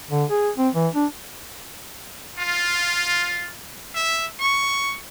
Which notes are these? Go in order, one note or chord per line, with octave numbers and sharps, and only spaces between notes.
D3
G#4
C4
E3
D4
F4
E5
C#6